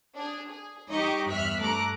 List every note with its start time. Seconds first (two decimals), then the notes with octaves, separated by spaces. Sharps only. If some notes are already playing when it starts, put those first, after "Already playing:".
0.16 D4 G#4
0.49 G#4
0.91 G3 D#4 G4 D#5 C#6 D6
1.30 E2 G2 E5 F6 F#6 B6
1.60 G2 A3 A4 A#5 D6 F#6